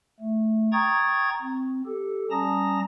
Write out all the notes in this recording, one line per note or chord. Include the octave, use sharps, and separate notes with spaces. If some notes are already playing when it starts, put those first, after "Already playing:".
A3
G5 A#5 C#6 D#6 G#6 A6
C4
G4 A4
G3 C#4 A5 A#5 D#6 A#6